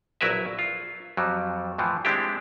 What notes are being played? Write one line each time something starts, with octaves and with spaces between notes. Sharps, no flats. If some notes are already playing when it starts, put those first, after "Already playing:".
A#1 F#3 E4 A#4 B4 E5
F4
F2 F#3 G3
A2 E3 F3
G#3 C4 D4 E4 G4